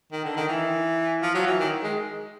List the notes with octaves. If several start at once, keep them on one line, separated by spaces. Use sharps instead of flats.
D#3
D3
D#3
E3
F3
F#3
E3
D#3
G#3